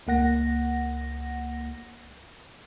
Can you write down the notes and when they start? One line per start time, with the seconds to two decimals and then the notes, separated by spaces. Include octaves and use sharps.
0.07 C#2 A#3 F#5 A#6